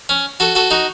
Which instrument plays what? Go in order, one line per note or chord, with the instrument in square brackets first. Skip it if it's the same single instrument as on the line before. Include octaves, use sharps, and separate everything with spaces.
[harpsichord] C#4
F#4 A4
F#4 A4
D#4 F#4